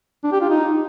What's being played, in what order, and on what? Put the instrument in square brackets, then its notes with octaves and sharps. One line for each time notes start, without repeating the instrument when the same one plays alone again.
[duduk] D4
G4
F4
D#4